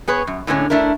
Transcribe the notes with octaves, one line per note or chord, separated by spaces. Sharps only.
B3 G#4 B4 C#5
F#2
A2 D3 G#3 A#3 C#4
A3 D4 E4 A#4